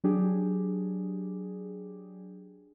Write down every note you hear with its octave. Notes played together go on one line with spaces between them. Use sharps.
F#3 D4 G4 G#4